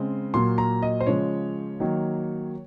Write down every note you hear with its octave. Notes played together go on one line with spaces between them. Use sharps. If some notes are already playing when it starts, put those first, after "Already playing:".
Already playing: C#3 G#3 C4
A#2 F#3 A#3 C6
A#5
D#5
C5
C#3 F3 G#3 C#5
D#3 F#3 A#3